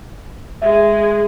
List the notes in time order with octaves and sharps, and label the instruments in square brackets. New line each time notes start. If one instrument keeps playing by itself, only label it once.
[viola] G#3 G#4 [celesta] E5